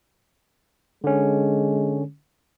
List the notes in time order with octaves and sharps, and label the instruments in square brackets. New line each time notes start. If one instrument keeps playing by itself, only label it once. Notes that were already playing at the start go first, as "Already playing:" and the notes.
[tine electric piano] D3 C#4 [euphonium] G#3